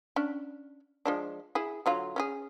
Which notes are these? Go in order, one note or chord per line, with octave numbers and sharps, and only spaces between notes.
C#4 D4
F3 G#3 D4
E4 G#4
D3 F#3 F4
C#4 G4 G#4